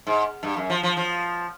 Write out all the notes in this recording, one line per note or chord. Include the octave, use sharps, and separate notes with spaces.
G#2
G2
F#2
F3
F3
F3